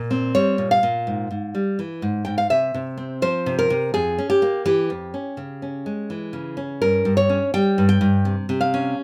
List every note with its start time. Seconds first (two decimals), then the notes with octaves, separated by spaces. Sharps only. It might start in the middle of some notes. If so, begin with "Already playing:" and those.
Already playing: A#2
0.11 C4
0.35 G3 C#5
0.58 A#2
0.71 F5
0.83 A#2
1.07 G#2
1.31 G#2
1.55 G3
1.79 E3
2.02 G#2
2.25 G#2 G5
2.38 F5
2.50 C3 E5
2.74 C3
2.97 C4
3.22 F3 C5
3.46 C3
3.59 A#4
3.70 C3
3.94 F2 G#4
4.18 C#4
4.30 G4
4.42 A#3
4.65 E3 G4
4.90 F2
5.14 C#4
5.37 C#3
5.62 C#4
5.86 G#3
6.10 E3
6.33 C#3
6.57 C#4
6.82 G2 A#4
7.05 G2
7.17 C#5
7.29 C#4
7.54 G3 G5
7.78 G2
7.89 G5
8.01 G2
8.25 C3
8.49 C3
8.61 F5
8.74 C#4